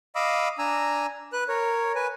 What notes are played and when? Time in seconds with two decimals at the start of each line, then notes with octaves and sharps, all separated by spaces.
0.15 D#5 F5 B5 D6 E6
0.58 D4 G#5 A#5 E6
1.33 B4 F#6
1.48 A#4 C#5
1.95 B4 G#5